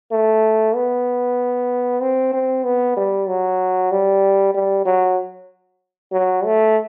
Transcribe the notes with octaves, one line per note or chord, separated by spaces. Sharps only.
A3
B3
C4
C4
B3
G3
F#3
G3
G3
F#3
F#3
A3